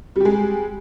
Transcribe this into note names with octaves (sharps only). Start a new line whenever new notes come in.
G3 G#3 G4